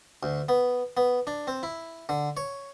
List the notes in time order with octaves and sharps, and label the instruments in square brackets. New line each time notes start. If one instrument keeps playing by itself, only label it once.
[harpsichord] D2
B3
B3
D4
C4
E4
D3
C#5